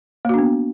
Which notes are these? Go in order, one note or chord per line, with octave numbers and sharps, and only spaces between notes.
A#3 B3 D4 F#4